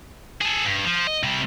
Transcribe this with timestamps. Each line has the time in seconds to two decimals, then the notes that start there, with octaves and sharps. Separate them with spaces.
0.41 G#4 A4
0.65 G2
0.85 F3
1.07 D#5
1.23 C3 G3